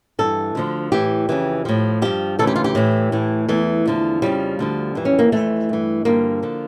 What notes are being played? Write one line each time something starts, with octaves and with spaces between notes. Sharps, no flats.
G2 E3 A4
D2 D3 F3
A2 E3 G4
F2 C#3 E3
A2 F3
G2 F3 G4
D2 C#3 E3 A4
G4
F4
G4
A2 E3
A2 E3
E2 E3 A3
E2 D3 F3
F2 C#3 F3 G3
D2 D3 F3
F2 E3
C#4
A#3
F2 E3 A3
G2 E3
G2 D3 F3 A#3
D3 F3